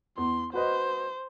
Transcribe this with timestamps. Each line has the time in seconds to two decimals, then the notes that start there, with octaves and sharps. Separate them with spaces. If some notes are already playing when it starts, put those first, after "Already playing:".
0.18 E2 C6
0.54 F#4 B4 C5 D#5